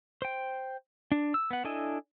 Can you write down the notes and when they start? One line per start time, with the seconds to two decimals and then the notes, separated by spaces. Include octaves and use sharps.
0.22 C5 G5
1.12 D4
1.34 E6
1.51 B3 F#5
1.64 D4 E4 A4 D#5 G#5